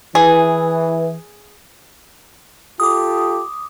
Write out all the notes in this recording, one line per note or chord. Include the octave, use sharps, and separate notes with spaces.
E3 G#4
F4 G4 A4 D6 D#6